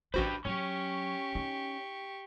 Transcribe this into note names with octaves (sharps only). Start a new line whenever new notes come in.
A1 D4 F#4 G4 B4 C5
F#3 C#4 G4 C#6
D#4